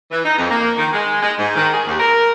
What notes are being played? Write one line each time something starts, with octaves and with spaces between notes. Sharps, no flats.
E3
D#4
F2
A#3
D#3
G#3
G#3
G#2
D#3
G#4
D#2
A#4